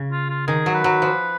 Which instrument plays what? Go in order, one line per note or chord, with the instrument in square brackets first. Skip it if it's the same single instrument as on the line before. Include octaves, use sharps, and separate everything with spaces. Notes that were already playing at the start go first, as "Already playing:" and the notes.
Already playing: [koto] C#3
[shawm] F4
F4
[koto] D#3 [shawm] G#4
[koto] F#3
[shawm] B4
[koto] F#3
F3